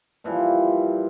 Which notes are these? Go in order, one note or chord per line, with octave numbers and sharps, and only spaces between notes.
A#2 E3 F3 G3